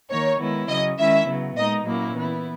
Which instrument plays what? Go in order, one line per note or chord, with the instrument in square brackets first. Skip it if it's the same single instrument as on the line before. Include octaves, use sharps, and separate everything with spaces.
[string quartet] D#3 A#3 D#4 [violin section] C#5
[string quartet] D#3 G#3 B3 E4
[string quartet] C#3 F#3 C#4 [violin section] D#5
[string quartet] D#3 G#3 C#4 E4 [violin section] E5
[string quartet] C#3 F#3 B3
[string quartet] A#2 G#3 D#4 [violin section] D#5
[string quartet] A#2 F#3 A#3 C#4 E4
E3 B3 E4